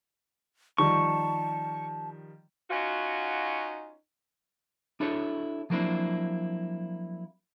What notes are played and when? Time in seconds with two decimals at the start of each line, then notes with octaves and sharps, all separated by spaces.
0.78 D#3 F3 G3 A5 C#6
2.70 C#4 D#4 F4 F#4
5.00 D4 E4 F#4 A4 C#5
5.70 F3 F#3 A#3 C4 D4 E4